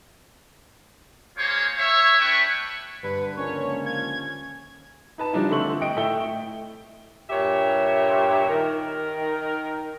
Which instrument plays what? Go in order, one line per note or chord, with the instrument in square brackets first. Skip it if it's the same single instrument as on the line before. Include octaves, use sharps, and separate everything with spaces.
[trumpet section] A#3 F4 G#4 C5 C#5 C#6
C#5 E5
A3 D4 E4 B4 G5 C#6
[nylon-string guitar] G2 D3 G3 [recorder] B4
[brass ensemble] C#2 F3 A#3 [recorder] C#4 [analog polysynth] C#5
[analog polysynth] G#6
[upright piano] D#4 B4 A5
E3 F3 G3 D4 D#4
D3 A3 C4 C6 C#6 F#7
D#5 G5 D#6 D7
A2 A3 E5 G5 G7
[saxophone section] G2 A#2 G4 C#5 E5
D#3 A#4